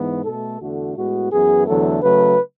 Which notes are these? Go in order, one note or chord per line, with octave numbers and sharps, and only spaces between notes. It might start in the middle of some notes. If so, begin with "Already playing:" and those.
Already playing: G#2 E3 B3
B2 A3 A4
E2 D3 A3 F#4
A2 G#3 B3 F#4
F#2 E3 B3 G#4
E2 D3 F#3 A3 A4
C#3 F#3 A3 B4